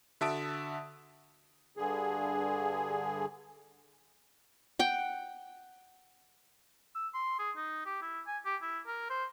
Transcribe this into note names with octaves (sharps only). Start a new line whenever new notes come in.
D3 F#4 E5 A5 D#6 D7
G2 D3 G#4
F#5 G5
E6
C6
G#4
D#4
G4
E4
G#5
G4
E4
A#4
C5